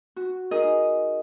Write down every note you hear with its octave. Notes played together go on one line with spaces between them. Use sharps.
F#4
D#4 G#4 A#4 D#5